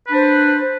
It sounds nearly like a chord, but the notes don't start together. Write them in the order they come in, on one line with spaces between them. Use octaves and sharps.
B4 D4 C5